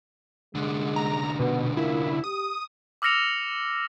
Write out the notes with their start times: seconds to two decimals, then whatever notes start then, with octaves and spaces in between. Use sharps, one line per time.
0.55 C2 D3 G#3
0.96 A#5
1.39 B2 B3
1.77 A#2 E4
2.24 G4 D#6
3.02 D6 E6 F6 A#6 C#7 F7